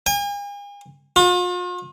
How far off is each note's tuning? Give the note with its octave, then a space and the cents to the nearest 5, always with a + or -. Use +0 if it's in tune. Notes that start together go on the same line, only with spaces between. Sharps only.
G#5 -45
F4 +45